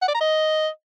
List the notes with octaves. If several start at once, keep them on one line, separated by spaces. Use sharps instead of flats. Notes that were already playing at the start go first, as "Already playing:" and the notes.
F#5
D5
A#5
D#5